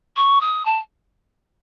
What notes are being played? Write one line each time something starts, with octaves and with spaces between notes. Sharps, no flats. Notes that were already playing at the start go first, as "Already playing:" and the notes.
C#6
D#6
A5